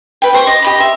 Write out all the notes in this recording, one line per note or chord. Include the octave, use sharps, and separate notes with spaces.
B4 G5
G4 C5 C6 C#6
D#5 D6
G4 D#5 B5
E5 C6